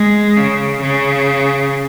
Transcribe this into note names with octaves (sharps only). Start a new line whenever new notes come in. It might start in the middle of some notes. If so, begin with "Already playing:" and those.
Already playing: G#3
C#3
C#3